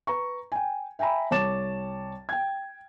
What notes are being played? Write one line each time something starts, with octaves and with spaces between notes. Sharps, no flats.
B4 A#5 C#6
G5 G#5
E5 G5 G#5 A#5 B5
C2 C#5 A5 D6 A6 E7
G5 G#6